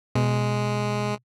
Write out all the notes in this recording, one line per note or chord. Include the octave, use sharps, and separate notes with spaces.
B2 G#3